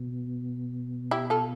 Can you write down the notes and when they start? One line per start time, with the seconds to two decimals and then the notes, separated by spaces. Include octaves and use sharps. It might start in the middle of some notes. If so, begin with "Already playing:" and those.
Already playing: B2
1.11 E4 G4
1.30 F4 A4